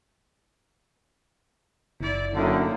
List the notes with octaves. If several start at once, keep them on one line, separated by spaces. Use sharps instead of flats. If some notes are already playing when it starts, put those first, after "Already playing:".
F#1 E4 D5
F#2 A2 D3 A#3 D#4